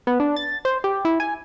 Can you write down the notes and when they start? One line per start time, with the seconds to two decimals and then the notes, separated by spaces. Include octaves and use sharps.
0.07 B3
0.20 D4
0.36 A6
0.65 C5
0.84 G4
1.05 E4
1.20 G#5